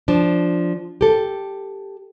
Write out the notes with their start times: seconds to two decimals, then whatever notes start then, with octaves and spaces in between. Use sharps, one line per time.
0.08 F3 D4
1.01 G4 A4